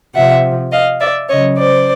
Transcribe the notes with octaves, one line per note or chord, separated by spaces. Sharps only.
C3 F3 E5 F#5
D#5 F5
D5 E5
C#3 F#3 C#5 D#5
C5 D5